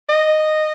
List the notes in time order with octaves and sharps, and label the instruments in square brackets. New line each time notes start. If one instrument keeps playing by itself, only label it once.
[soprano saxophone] D#5